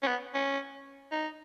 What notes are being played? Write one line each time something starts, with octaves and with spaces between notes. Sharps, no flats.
C#4
B3
C#4
D#4